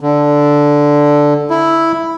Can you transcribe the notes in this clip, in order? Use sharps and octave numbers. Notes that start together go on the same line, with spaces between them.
D3
E4